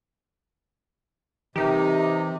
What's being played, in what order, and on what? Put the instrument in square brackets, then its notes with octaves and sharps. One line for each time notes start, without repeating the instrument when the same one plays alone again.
[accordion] C3 [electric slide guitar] E3 A#4 B4 [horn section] D#4 [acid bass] G4